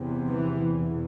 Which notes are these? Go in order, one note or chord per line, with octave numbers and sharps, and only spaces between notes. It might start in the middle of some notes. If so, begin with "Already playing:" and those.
Already playing: E2 C3
E3
E2 B2